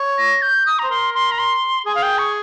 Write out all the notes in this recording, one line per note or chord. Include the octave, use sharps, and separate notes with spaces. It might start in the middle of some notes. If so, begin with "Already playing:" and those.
Already playing: C#5
A#6
G6
D#6
C5 A#5
A#4 C6
C6
A#5
C6
G#4 G#5
F5
G5
C#6